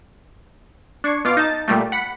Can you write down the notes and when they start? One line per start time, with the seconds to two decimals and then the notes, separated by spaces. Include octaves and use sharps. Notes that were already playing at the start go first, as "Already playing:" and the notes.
1.04 D4 C#6 G#6 C7 C#7
1.25 B2 F4 D6 F6 C7
1.37 D#4 A5 A6
1.68 A#2 G3 A3
1.92 F#5 B5